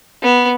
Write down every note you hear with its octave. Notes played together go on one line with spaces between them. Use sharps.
B3